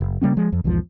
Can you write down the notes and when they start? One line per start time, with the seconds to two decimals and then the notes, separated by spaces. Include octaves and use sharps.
0.01 F#1
0.21 C#3 G3 A#3 C#4
0.37 F3 G#3
0.52 F2
0.64 B1 E2 G#2 F3